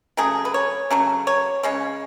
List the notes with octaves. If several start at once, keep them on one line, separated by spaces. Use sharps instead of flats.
C#3 F#3 A3 G#4
B4
C#5
C#3 F#3 A3
C#5
C#3 G#3 C#5